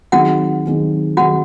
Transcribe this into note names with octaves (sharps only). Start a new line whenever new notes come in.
D#3 F#3 C4 D#4 F#4 G#4 F#5
D#3 F#3 C4 D#4 G#4
D#3 F#3 C4 D#4 F#4 G#4 F#5